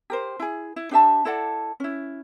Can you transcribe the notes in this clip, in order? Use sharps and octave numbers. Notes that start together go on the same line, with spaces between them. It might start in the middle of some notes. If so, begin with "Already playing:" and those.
G4 A#4 C5
E4 G#4
E4
D4 G4 E5 A5
E4 A4 D5 F#5
C#4 E4